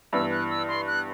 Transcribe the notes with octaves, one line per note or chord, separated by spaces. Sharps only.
G2 E3 B3 E6
F#6
E6
C6
F#6